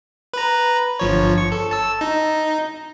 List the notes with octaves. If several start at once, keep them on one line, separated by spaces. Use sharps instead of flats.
B4 A#5
G1 F3 C#5
C#6
A4
A5 E6
D#4